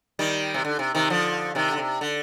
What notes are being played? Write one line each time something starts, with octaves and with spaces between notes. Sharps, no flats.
D#3 G3
C3
D3
C3
C3 D#3
D3 F3
C3 D#3
D3
C3
D3